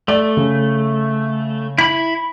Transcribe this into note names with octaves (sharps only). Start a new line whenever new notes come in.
A3 D5
C#3
E4 B5